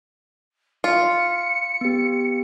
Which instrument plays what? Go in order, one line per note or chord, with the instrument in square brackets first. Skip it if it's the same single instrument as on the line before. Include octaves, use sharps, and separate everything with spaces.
[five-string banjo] F4 [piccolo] C#7
[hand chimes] B3 G4